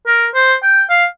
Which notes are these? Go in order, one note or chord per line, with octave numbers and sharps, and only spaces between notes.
A#4
C5
G5
F5